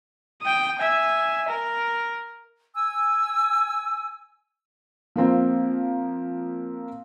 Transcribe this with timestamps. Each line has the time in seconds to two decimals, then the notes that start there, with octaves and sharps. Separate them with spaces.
0.42 G5 D#6
0.79 E5 G#5
1.49 A#4
2.75 G#5 E6
5.16 F3 A#3 C4